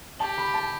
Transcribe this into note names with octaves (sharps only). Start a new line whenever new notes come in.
G4 A5
B5
A5